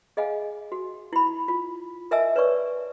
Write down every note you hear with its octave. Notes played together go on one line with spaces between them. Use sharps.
G#4 D#5 F5 F#5 G#5
F#4
E4 B5
F4
A#4 D#5 E5 G#5 A5 E6
B4 C#5 D5 C#6